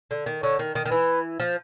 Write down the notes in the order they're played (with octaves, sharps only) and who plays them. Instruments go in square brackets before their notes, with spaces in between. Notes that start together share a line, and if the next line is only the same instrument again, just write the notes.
[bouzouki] D3
D#3
[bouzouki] D3 [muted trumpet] C#5
[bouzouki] D#3
D#3
D#3
[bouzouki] E3 [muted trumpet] B4
[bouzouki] F3